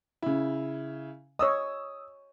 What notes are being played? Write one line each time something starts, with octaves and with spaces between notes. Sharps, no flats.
C#3 E4
C#5 D#5 D#6 E6